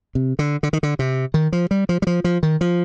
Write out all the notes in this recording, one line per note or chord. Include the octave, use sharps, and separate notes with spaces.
C3
D3
D3
D#3
D3
C3
D#3
F3
G3
F3
G3
F3
F3
D#3
F3